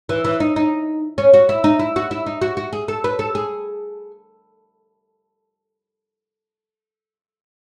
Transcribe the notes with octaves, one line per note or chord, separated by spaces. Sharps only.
E3
E3
D#4
D#4
C#4
F#4
E4
D#4
E4
F#4
E4
D#4
F#4
F#4
G#4
A4
B4
A4
G#4